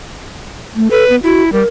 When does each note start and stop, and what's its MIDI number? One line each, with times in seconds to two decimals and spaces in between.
0.76 0.91 57
0.91 1.04 69
0.91 1.16 71
1.10 1.21 59
1.23 1.52 64
1.23 1.43 66
1.52 1.63 55
1.52 1.67 70